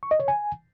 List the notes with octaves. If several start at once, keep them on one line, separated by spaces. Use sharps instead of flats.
C#6
D#5
C#5
G#5